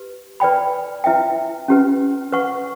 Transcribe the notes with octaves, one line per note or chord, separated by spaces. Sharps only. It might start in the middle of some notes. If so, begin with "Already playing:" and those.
Already playing: G4 B4
B4 D5 G5 B5
E4 B4 E5 G5
C#4 G4 B4
B4 F#5 C#6